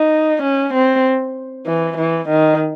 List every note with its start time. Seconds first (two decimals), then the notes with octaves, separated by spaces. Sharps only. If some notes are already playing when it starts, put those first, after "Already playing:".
Already playing: D#4
0.43 C#4
0.74 C4
1.66 E3
1.98 E3
2.29 D#3